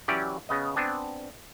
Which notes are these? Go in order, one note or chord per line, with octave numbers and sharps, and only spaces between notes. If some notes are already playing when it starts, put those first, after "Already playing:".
E3 F#3 C#4 G4 D5
C#3 B3 D#5
B3 C4 D4 G#5